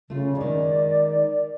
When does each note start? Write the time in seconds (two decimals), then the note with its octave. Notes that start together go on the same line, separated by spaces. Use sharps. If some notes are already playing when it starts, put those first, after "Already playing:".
0.10 C#3 A3 F4
0.36 D#3 G#3 D5